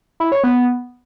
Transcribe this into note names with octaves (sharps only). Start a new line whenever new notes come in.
E4
C#5
B3